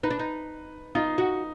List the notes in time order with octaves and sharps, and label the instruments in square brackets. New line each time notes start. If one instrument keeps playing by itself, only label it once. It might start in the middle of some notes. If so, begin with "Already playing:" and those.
[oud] D#4 [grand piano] B4
[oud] D4
D#4
[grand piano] D#4 [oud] F4
[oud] F#4